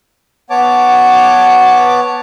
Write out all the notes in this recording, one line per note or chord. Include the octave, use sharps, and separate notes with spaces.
B3 C#5 A5 D6